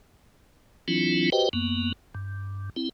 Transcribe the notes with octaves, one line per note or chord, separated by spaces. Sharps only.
E3 F#3 C4 D4 E4 F4
F#4 G4 B4 C5 D#5 G5
F#2 A#3 B3
G2
C4 E4